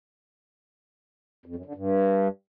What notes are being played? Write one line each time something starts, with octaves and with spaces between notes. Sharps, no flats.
F2
F#2
D3
G2